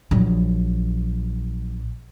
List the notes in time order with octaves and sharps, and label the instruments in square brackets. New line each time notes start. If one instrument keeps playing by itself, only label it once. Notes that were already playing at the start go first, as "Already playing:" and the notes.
[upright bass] A#1 F#3